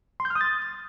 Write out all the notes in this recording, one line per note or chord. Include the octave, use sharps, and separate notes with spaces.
C6
G6
F6
D#6
A6